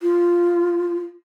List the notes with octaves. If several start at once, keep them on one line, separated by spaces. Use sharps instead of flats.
F4